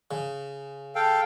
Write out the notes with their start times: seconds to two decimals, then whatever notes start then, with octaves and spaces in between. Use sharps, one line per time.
0.11 C#3
0.95 A4 F5 G5